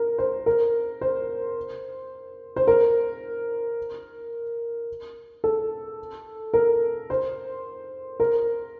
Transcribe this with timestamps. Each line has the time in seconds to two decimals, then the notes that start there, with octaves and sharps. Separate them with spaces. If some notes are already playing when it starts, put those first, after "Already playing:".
Already playing: A#4
0.18 C5
0.46 A#4
1.01 C5
2.56 C5
2.67 A#4
5.44 A4
6.54 A#4
7.10 C5
8.20 A#4